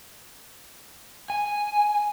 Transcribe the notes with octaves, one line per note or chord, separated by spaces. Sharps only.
G#5